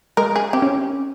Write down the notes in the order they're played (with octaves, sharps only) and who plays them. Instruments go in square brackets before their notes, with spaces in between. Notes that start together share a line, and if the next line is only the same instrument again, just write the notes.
[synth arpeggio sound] G#3 [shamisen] A#4
[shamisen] G#4
[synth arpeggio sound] C4 [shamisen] G4
[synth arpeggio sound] C#4